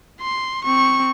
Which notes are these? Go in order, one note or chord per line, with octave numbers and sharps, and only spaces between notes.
C6
C4 C#6